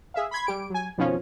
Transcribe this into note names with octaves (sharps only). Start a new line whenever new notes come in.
G#4 E5 F5
B5 C6 G#6 B6
G3 G4 D7
F#3 G#5
F2 B2 D#3 F3 C#4 F4